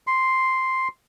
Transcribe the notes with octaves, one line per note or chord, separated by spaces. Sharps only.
C6